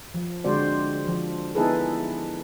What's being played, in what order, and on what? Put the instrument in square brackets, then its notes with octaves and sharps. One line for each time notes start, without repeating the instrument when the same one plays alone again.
[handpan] F3
D3 G#3 C4 F#4 C5 D5
F3
B3 D#4 E4 G#4 A4 B4